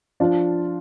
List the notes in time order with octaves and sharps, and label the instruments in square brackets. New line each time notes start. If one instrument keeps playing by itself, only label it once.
[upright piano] F3 D4 F4